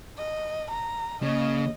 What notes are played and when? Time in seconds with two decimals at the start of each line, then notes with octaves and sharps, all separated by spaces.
0.17 D#5
0.71 A#5
1.23 C#3 A#3 D#5